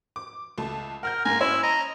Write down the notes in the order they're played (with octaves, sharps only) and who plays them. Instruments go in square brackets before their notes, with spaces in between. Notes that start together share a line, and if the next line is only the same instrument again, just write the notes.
[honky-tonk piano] D6
C#2 A3 A5
[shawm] A#4 [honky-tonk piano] F#5 F6 G6
[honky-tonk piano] G#2 A#3 [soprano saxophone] G#5 [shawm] A#5
[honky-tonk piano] C#4 C5 C#5 [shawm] E4
[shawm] D#5 [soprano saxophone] A#5